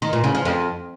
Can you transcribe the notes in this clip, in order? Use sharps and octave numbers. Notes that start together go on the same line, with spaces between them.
D#3
A#2
C#3
F3
F2